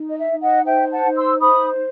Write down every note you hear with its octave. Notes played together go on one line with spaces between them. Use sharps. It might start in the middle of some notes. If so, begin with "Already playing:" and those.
Already playing: D#4
D#5
E5
D#4
D#5 F#5
C5 E5 G5
F#5 A5
D#4
C6 E6
C5 B5 D#6